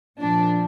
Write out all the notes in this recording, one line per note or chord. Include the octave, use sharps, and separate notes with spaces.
A#2 F3 D4